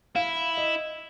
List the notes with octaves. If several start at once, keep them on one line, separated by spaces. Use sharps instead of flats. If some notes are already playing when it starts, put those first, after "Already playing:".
E4 F5
D#5